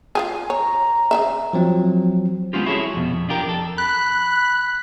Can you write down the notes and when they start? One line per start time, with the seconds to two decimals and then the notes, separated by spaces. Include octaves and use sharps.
0.15 F4 G4 G#4
0.50 C#5 A#5
1.11 C#3 E3 E5
1.53 F3 F#3 C4
2.53 G#3 B3 C#4 F4 G4
2.66 E4 F#4 G#4 A4 C#5 E5
2.94 F2 B2
3.13 F2
3.29 D4 F4 G4 A#4
3.46 F2 A4
3.78 B5 F#6